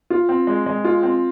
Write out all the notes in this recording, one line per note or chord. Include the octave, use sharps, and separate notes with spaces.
F4
C4
G#3
G#3
F4
C4